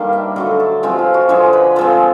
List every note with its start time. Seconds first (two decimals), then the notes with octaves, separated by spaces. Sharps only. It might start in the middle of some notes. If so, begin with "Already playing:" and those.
Already playing: D#3 G3 A#3 D4
0.13 E5
0.36 D3 F#3 A3 D#5
0.60 A4
0.83 F3 G#3 C4 F4 G4
0.98 F4
1.14 F#4
1.29 D3 F3 G#3 C5
1.53 B4
1.76 F3 G#3 C4 A4